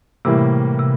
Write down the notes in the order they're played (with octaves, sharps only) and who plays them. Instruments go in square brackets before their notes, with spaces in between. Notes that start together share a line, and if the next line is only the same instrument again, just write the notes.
[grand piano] A2 E3 G3 A#3 [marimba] C3
[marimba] C3